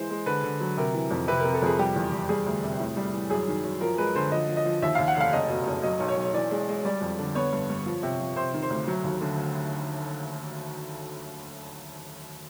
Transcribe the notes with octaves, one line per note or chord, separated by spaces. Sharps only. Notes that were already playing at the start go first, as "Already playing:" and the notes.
Already playing: E3 G#3 C5
G#3
D3 B4
D3
F#3
C3 A#4
E3
F2
C3 B4
C3 A#4
A4
F2 G#4
G3 G4
E2
E2
G3 G#4
D2
C3
A2
G3
E3
F#2 G#4
D#3
F#2
F3 A#4
G#3 B4
D3 C5
F3 D#5
F3
D#5
F3
D#2 E5
D#2 F5
F#5
F1 F5
F#1 D#5
B2
F#1
F#3 D#5
B1
C#5
B1
E3 D5
G#3
G#3
G3 D5
F2
D3
B3 C#5
G2
G2
F3
C3
F3
C3 C5
D#3
C5
D2
F#3
D#2
D3